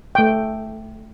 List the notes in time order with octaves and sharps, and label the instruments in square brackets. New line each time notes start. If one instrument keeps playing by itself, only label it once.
[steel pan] A3 G5